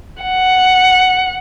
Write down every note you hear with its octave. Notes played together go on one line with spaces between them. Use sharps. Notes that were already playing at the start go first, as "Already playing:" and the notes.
F#5